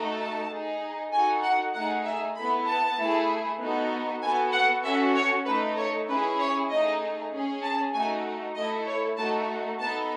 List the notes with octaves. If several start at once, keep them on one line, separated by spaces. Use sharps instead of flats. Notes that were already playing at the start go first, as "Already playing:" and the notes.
Already playing: A3 D#4 F#4 A4
A5
D#4 G#4
D#4 F#4 A4 G#5
F#5
A3 D#4 G#4 F#5
E5
B3 E4 A4 B5
A5
A3 E4 G#4
B3 D#4 F#4 A4
B3 F#4 A4 G#5
F#5
C#4 F#4 A4 E5
C#5
A3 D#4 A4 B4
C#5
C#4 E4 G#4 B4
C#5
A3 D#4 G#4 D#5
C#4 G#4
A5
A3 D#4 F#4 G#5
A3 E4 A4 D#5
C#5
A3 D#4 F#4 A4 A5
B3 D#4 A4 A5